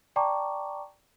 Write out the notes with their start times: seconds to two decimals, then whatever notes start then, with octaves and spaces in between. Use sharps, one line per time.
0.16 D5 G5 A5 A#5 C#6 D6